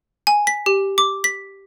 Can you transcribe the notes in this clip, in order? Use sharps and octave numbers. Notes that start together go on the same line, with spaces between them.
G#5
B6
G4
D6
B6